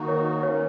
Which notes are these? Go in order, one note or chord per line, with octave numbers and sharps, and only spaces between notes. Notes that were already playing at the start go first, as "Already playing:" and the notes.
Already playing: D#3 A#3 D#4 F#4
C#5
D#3 A#3 C#4 C#5